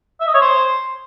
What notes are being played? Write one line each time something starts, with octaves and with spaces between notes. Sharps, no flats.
E5
D#5
C#5
C5